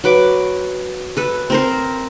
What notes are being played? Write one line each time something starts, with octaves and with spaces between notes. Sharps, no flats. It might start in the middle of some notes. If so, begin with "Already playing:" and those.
F#3 B4 D6
A4 B4
C4 A#4 C5